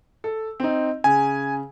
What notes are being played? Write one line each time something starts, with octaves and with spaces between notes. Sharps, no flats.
A4
C4 D#4
C#3 G#5